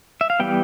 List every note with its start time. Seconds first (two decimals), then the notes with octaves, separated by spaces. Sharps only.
0.21 E5
0.30 F5
0.39 E3 G3 B3 G5